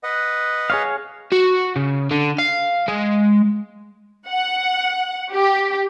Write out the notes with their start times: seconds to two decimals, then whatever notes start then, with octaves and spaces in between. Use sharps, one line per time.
0.03 B4 D#5 F#5
0.70 G#4 C#5 F5
1.32 F#4
1.76 C#3
2.11 D3
2.38 F5
2.88 G#3
4.29 F#5
5.32 G4